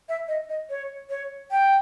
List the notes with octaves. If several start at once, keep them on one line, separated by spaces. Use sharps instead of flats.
E5
D#5
D#5
C#5
C#5
G5